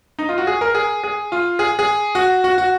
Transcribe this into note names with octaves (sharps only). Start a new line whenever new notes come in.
D#4
F4
F#4
G#4
A#4
G#4
G#4
F4
G#4
G#4
F#4
F#4
F#4